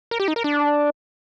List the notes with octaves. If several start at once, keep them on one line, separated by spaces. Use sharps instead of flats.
A#4
G4
D#4
A#4
D4